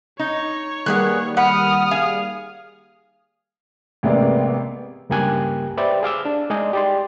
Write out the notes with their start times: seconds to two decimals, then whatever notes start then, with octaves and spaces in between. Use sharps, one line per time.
0.19 D#4 C#5
0.86 D#3 G3 A#3 B3 G#4 F#6
1.37 F#5 B5 D#6 F6
1.91 G#4 F5
4.03 A1 C3 G#3 A#3 B3 D5
5.10 C#2 G2 A#3 G4 G#5 F#6
5.77 G4 B4 C5 D5 E5
6.03 G#4 F5 D6 E6
6.25 D4
6.50 G#3 D#4 G#4 D5 D#5
6.73 G4 D5 C6